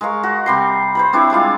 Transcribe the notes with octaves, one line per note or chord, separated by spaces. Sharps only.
G#3 A#4 F5 C#6
F#4
C3 G3 C6
C5 C#5 B5
C4 D4 E4 C#5
G3 G#3 F4 F5